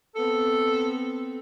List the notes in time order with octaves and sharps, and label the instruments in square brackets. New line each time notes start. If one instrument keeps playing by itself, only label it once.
[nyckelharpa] B3 C4 [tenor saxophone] A4